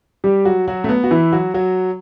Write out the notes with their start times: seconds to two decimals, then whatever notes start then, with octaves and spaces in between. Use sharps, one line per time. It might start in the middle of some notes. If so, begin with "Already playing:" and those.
0.24 G3 G4
0.45 F#3 F#4
0.68 F#3 F#4
0.84 A3
0.89 B3
1.04 F#4
1.11 E3 E4
1.32 F#3 F#4
1.54 F#3 F#4